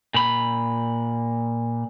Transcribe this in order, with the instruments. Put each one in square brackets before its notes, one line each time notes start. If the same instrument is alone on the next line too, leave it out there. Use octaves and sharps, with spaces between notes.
[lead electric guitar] A#2 B5